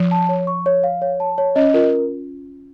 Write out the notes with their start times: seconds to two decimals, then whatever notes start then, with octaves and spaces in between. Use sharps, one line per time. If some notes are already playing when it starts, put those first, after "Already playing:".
Already playing: F3
0.11 A5
0.29 C#5
0.47 C#6
0.66 C#5
0.84 F5
1.02 C#5
1.20 A5
1.38 C#5
1.55 C#4 D#5
1.74 F4 A#4